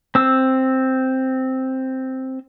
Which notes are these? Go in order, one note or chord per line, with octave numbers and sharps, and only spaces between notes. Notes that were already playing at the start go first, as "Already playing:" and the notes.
C4 E6